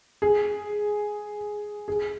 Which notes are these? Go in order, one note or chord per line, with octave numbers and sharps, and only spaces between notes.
G#4
G#4